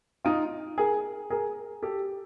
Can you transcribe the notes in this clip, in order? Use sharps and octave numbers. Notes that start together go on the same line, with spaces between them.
D#4 F4
G#4 A#4
G#4 A#4
G4 A4